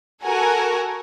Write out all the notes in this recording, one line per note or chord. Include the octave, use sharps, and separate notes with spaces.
F#4 A4 A#4 F#5 G#5